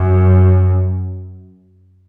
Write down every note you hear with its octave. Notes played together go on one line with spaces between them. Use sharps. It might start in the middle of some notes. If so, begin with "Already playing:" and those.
Already playing: F#2